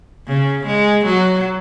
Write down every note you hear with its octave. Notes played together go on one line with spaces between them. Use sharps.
C#3
G#3
F#3